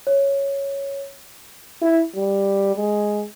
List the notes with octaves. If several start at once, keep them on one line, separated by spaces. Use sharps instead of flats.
C#5
E4
G3
G#3